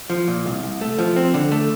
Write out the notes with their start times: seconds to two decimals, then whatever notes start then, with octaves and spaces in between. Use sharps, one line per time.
0.10 F3
0.28 A#2
0.45 C2
0.63 C2
0.81 A3
0.98 F3
1.16 C4
1.34 D3
1.52 A3